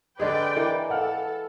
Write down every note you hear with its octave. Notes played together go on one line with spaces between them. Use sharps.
D3 G#3 G#4 B4 D5 G5
E3 A#4
A4 F5 F#5 F6